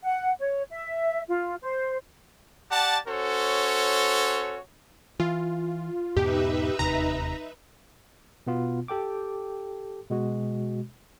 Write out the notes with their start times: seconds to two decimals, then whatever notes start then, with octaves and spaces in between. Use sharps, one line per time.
0.03 F#5
0.40 C#5
0.71 E5
1.28 F4
1.62 C5
2.71 G4 D5 F#5 A5
3.08 C#4 F#4 A4 C5 C#5
5.20 E3 F4
6.17 E2 G#2 B2 D#4 G4 B4 E5
6.79 E1 D#2 C3 A#5
8.47 B2 B3 F4
8.88 G4 A4 G5 D6
10.10 B2 G#3 F#4